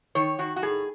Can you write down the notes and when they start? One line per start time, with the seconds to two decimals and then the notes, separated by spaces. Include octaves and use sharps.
0.15 D#3 C#5
0.39 D#3 F#4
0.56 F#4
0.62 A2 G#4